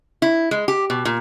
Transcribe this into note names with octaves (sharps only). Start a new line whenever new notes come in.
E4
G#3
G4
B2
A#2